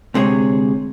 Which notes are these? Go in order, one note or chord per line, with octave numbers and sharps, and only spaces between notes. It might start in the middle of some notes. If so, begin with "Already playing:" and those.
D2 C3 G#3 D#4 G#4 C#5